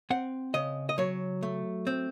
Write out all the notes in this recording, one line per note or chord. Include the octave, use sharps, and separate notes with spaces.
C4 F#5
C#3 D#5
D#5
F#3 C#5
A3
C4